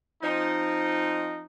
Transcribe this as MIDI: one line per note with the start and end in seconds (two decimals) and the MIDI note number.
0.22 1.43 53
0.22 1.43 60
0.22 1.43 63